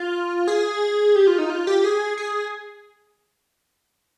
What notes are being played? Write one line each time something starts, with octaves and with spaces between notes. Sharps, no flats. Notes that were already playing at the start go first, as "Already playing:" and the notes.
Already playing: F4
G#4
G4
F4
D#4
F4
G4
G#4
G#4